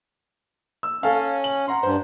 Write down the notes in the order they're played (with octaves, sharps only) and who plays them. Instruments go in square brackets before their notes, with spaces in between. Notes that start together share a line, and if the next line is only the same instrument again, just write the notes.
[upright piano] E6
[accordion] C#4 [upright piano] A4 F5
[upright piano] F#7
F#5 A#5 C6
[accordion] G2 [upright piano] C5